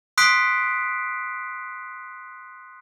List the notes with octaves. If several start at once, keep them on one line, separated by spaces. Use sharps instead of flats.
C6 D#6 F#6 B6 C7 D7